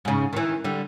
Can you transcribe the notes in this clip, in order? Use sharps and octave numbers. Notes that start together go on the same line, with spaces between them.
G#2 C#3
D#3 E3
D3 G3